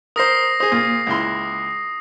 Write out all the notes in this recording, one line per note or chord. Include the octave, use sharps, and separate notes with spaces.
A#4 C5 D#6 A#6 C7
G#4 C5 D#6
A#2
C#2 E4 C6